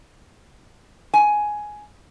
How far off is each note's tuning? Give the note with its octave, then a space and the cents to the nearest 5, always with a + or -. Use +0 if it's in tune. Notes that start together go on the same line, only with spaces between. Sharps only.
G#5 +10